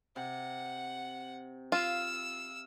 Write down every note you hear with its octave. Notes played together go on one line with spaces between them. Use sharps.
C3 F#5
F4 F5 E6